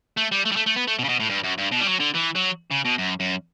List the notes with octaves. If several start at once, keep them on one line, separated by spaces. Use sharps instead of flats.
A3
G3
A3
G3
A3
A3
B3
A3
B2
C#3
B2
A2
G2
F#2
G2
B2
G3
F#3
D3
E3
F#3
C#3
B2
F#2
F#2